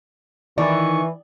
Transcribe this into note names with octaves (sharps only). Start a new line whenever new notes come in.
D#3 E3 D5 C#6